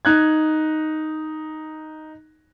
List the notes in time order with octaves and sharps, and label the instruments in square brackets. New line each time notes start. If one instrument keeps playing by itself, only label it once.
[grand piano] D#4 F#6 G#6